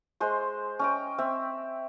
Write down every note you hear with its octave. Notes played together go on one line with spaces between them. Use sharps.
G#3 C5 C6
C#4 D#5 G5
C4 E5